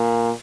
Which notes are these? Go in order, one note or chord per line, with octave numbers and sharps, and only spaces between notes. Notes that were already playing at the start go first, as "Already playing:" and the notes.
Already playing: A#2